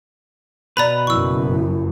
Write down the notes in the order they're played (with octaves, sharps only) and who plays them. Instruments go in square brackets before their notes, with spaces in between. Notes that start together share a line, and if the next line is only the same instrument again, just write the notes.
[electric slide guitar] B2 B4 [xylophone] D5 A#5 B5
[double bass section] F#1 F#2 [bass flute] E4 [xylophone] C#6 E6